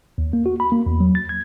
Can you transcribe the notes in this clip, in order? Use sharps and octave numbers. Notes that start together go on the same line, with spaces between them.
D#2
A#3
F#4
B5
A#3
E2
F#3
A6
G#6